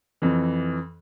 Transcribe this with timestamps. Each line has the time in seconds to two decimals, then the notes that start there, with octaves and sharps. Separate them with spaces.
0.22 F2 E3